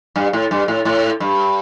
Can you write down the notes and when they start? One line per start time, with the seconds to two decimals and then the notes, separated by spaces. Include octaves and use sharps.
0.16 G2
0.33 A2
0.51 G2
0.68 A2
0.85 A2
1.20 G2